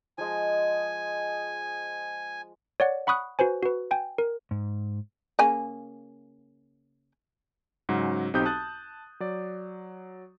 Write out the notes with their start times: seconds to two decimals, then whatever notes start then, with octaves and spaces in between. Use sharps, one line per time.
0.18 F3 G#3 D#5 G#5
2.80 C#5 D5 F#5
3.07 F#5 B5 C#6 D#6 F#6
3.39 F#4 B4 C5 G#5
3.63 F#4 B4
3.91 G5 G#5
4.18 A#4
4.51 G#2
5.39 C#3 A#3 G#5
7.89 G#2 C#3 F#3 C#4 F#4
8.34 B1 C4 D#4 G4 D#6 G6
8.45 A5 D#6 F#6 A6
9.20 F#3 D5